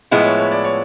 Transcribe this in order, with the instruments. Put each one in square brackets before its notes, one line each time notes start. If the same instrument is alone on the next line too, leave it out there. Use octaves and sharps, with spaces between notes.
[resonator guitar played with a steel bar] A2 F3 G#3 B3 E4
[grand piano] C#5
C#5
D5
C#5